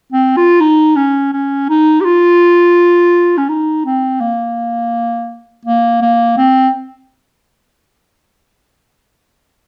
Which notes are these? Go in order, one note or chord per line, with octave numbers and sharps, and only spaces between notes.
C4
F4
D#4
C#4
C#4
D#4
G4
F4
C#4
D#4
C4
A#3
A#3
A#3
C4